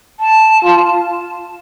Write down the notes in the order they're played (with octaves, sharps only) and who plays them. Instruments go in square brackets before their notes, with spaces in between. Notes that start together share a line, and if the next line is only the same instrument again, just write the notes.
[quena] A5
[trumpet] F4